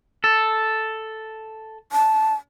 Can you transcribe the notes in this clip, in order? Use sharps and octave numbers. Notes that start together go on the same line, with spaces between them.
A4
A5